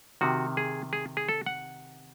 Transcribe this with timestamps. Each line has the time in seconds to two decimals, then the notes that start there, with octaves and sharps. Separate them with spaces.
0.21 C3 D#3 F#4
0.57 G#4
0.93 G#4
1.17 G#4
1.29 A4
1.46 F#5